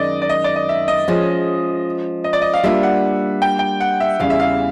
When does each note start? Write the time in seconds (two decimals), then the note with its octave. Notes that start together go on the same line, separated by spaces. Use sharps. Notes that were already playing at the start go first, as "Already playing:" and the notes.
Already playing: F#2 D#3 G#3 D5 D#5
0.22 D5
0.29 D#5
0.44 D5
0.56 D#5
0.69 E5
0.88 D#5
1.08 F3 G#3 C#4
2.24 D#5
2.33 D5
2.42 D#5
2.54 F5
2.63 G3 A#3 D4 F4 E5
2.83 F#5
3.42 G5
3.59 G5
3.80 F#5
4.00 E5
4.19 E2 C#3 E3 G3 F5
4.30 E5
4.40 F5